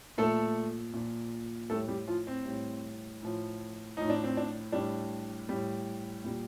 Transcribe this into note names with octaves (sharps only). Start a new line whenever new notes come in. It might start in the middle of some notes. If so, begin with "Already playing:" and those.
A#2 F3 A3 A4
A#2 F3
A2 G3 A3 A4
G3 G4
F3 F4
C4
A2 G3
A2 F3
A2 F3 D#4
D4
C4
D4
A2 G3 D4
A2 G3
A#2 G3